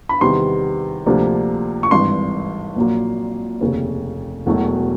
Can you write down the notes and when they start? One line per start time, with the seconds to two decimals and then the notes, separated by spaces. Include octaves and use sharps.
0.09 B5
0.21 E2 C3 D#3 G3 B3 C6
1.06 D2 C3 F3 A#3 D4
1.83 C#6
1.91 G#1 G2 E3 C6
2.76 A#1 A#2 F#3 A#3
3.61 F1 D#2 C#3
4.46 E1 E2 B2 F#3 A3